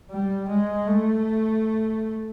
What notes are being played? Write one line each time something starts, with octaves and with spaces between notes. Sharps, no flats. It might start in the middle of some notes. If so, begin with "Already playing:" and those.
G3
G#3
A3